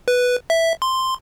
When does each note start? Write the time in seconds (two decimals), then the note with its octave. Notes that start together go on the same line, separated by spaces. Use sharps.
0.08 B4
0.50 E5
0.82 C6